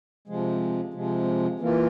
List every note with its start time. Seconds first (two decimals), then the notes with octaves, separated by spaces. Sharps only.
0.28 C3 F3 G#3
0.94 C3 F3 G#3
1.60 E3 A#3 F4